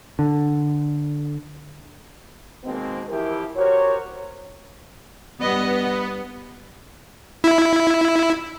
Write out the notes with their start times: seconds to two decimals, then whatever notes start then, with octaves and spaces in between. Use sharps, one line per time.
0.19 D3
2.64 B2 D#3 G#3 A#3 C4
3.08 E3 F3 E4 G4 A#4
3.55 F#4 G4 A#4 C5 C#5
5.39 G2 B3 D#5
7.44 E4